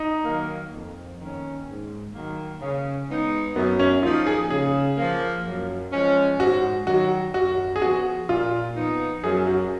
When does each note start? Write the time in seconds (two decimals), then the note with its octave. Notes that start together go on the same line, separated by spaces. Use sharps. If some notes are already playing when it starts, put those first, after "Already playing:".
Already playing: D#4
0.24 D#3 F#3 A#3
0.73 F2
1.20 D#3 A#3 C#4
1.67 G#2
2.13 D#3 F#3 A#3
2.61 C#3
3.09 G#3 B3 D#4
3.56 F#2 B3
3.79 C#4
4.03 F3 A#3 D#4 F4
4.27 G#4
4.50 C#3 G#4
4.97 F3 A#3
5.45 F#2
5.92 F3 G#3 C#4
6.39 G#2 F#4
6.86 D#3 F#3 F#4
7.34 F#2 F#4
7.76 G#4
7.82 F3 B3 F#4
8.29 A#2 F4
8.76 F3 B3 D#4
9.23 F#2 G#4
9.47 F#4